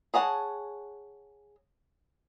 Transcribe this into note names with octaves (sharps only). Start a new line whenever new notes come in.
G#4 C#5 F#5 A5